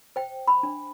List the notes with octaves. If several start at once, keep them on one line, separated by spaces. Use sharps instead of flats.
C5 G5
B5
D4